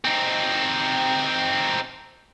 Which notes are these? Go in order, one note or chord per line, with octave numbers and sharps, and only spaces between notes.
C4 D#4